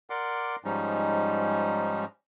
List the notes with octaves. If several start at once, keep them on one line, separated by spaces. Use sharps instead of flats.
A#4 D5 F#5 C6 D6
G#2 F3 G3 G#3 C#4 D#4